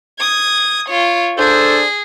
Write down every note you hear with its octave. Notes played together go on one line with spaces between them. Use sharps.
D#6 G#6
F4 C#5
D4 G#4 A4 C5